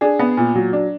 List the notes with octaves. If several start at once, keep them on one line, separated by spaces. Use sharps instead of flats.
D4 G#4
B3
A#2
F#3
D4